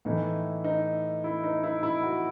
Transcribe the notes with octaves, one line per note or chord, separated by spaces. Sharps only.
A2 E3 A3 D#4
D#4
E4
D#4
E4
E4
F#4